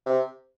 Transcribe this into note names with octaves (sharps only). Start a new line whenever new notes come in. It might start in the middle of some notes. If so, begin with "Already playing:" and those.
C3